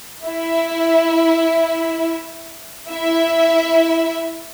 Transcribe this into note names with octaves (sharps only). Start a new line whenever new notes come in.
E4 E5
E4 E5